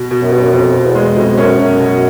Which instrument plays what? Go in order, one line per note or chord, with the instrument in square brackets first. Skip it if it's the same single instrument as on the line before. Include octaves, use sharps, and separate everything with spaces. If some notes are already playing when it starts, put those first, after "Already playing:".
Already playing: [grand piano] B2
B2
[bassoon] F#2
[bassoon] G2 [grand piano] B2
[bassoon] F#2
[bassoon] F2 [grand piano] B2
[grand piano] B2
[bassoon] E2
[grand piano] G#3
[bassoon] F2 [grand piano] B2
[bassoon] F#2 [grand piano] C#4
[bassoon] F#2 [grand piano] B2
[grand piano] B2